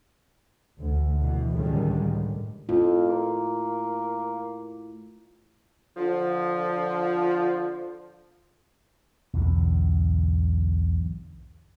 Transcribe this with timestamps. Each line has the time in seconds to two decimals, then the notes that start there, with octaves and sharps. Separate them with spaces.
0.80 D2
1.21 B2 E3
1.52 C#2 A2 D3 D#3 G3 G#3
2.02 A2
2.69 F2 A2 F4
3.09 A#3
5.97 D3 F3
9.33 B1 E2 G#2 D3